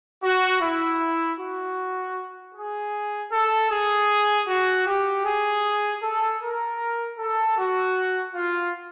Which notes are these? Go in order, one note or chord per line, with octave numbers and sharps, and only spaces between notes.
F#4
E4
F#4
G#4
A4
G#4
F#4
G4
G#4
A4
A#4
A4
F#4
F4